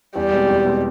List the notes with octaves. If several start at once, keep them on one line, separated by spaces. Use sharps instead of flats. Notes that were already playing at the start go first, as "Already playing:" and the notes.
E2 G3
B2 G#3 C4
E2
B2 G#3 C4